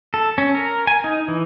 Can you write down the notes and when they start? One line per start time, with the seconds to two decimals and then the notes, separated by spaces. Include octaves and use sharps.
0.14 A4
0.38 C#4
0.55 A#4
0.87 G#5
1.04 D#4
1.28 E3